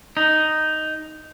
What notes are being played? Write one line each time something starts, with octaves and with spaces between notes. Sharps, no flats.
D#4